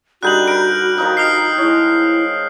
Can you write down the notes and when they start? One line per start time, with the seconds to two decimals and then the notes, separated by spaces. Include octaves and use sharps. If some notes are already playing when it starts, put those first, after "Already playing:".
0.23 D3 G3 D#4 F#4 F#6 G6 F#7
0.47 A#4 B4 D7
0.98 D#3 F3 D#4
1.17 D#6 F6 C7
1.58 G#3 E4 C#5